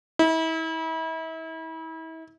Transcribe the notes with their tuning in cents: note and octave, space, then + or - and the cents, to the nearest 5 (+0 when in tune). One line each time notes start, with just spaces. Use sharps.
E4 -35